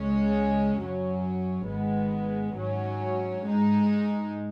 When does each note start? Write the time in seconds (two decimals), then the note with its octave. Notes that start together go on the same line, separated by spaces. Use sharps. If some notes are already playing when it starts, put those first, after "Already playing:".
Already playing: C#2 C#3 G#3 C#4
0.79 F#2 F#3 C#4
1.67 G#1 G#2 G#3 B3
2.56 G#2 F#3 C#4
3.45 G#2 G#3 D#4